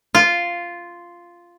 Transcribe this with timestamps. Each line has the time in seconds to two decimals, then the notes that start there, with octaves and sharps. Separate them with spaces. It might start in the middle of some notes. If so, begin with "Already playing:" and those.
0.15 F4